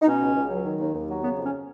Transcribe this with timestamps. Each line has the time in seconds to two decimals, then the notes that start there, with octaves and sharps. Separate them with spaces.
0.01 D#4
0.08 B2 C#4
0.22 C#2
0.36 C#2
0.50 F#3
0.65 D#3
0.80 D#2
0.94 D#2
1.09 F#3
1.23 C#3 B3
1.38 F2 C#4